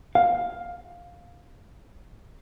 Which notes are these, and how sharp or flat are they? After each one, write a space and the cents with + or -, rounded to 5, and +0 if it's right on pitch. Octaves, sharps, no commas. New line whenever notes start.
F5 +10